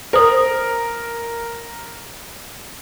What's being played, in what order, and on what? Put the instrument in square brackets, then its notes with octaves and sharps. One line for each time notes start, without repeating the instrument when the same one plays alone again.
[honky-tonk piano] A#4 [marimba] C5 D#6